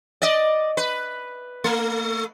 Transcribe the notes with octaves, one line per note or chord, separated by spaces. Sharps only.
D5 D#5
B4
A3